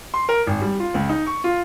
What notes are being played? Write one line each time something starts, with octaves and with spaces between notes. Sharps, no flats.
C6
A#4
G#1
G3
F4
C#2
D#4
C#6
F4